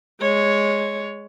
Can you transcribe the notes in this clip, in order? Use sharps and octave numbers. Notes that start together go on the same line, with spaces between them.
G#3 C#5